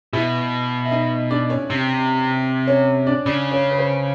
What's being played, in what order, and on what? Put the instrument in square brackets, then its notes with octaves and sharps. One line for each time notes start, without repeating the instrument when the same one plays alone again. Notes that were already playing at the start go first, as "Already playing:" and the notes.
[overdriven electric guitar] B2 [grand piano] E4 E5
[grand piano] E5
D#4 D#5
D4 D5
C#4 C#5
[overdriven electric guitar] C3
[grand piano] C#4 C#5
D4 D5
[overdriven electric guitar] C#3 [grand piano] D4 D5
[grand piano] C#4 C#5
B4
C5